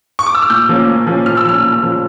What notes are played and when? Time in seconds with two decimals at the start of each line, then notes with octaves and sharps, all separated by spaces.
0.19 C#6
0.26 D6
0.35 E6
0.42 F6
0.50 A#2 G6
0.69 F3 A#3 C#4
0.88 A#2
1.07 F3 A#3 C#4
1.26 A#2 F6
1.37 E6
1.45 F3 A#3 C#4 F6
1.64 A#2
1.83 F3 A#3 C#4